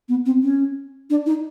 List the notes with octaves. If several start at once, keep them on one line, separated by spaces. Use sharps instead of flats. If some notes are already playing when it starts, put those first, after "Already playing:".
B3
C4
C#4
D4
D#4